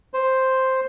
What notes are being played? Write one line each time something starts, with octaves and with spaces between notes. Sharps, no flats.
C5